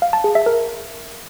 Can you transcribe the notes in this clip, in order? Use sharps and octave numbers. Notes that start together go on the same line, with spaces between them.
F5
A5
G#4
E5
A#4